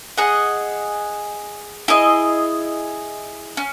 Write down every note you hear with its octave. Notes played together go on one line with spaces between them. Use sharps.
G#4 D#5 F#5
E4 G#4 D#5
C#4